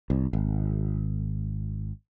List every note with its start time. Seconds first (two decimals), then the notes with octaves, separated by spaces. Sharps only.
0.10 C2
0.33 G#1